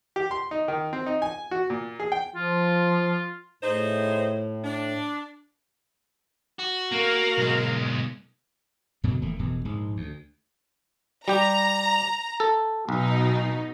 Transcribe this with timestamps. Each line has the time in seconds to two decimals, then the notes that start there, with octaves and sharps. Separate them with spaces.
0.16 G4
0.31 C6
0.51 D#4
0.68 D#3
0.93 C4
1.06 D#4
1.22 G#5
1.51 F#4
1.70 A#2
2.00 G#4
2.12 G5
2.34 F3 F4
3.63 A2 D#4 G#4 C5
4.64 D4
6.59 F#4
6.92 A#3 A#4 F5
7.38 B1 G#3
9.04 F#2 B2 D3 F#3
9.21 D#1 E2 A3 A#3
9.39 F#1 F2 B2 E3
9.65 A#1 G#2 G#3
9.97 D2
11.28 G3 G4 A#5
12.40 A4
12.89 B1 B2 D#4